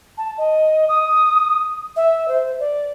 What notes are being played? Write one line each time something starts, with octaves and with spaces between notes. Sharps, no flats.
A5
D#5
D#6
E5
C5
D5